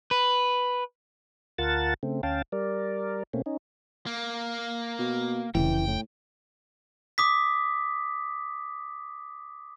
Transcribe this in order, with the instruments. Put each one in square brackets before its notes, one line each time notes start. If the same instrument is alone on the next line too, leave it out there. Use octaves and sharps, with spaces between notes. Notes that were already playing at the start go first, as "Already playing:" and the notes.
[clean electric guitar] B4
[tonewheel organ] D2 F4 A#4 F#5 A5 A6
C#3 A3 C4
D2 C#4 F5 G5 A5 A6
G3 A#4 D5
B2 A3 A#3 C4 C#4
C#4 D#4
[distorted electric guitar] A#3
[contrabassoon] B2
[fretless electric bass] F1 G#2 C#3 [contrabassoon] E3 [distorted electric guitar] G5
[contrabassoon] A2
[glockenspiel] D6 D#6 B6